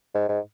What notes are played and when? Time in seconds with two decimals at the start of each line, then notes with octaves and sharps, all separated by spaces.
0.14 G#2
0.29 G#2